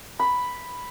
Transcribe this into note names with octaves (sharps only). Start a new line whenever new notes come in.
B5